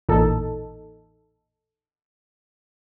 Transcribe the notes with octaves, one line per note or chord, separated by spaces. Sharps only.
A1 E2 A#2 D#4 A4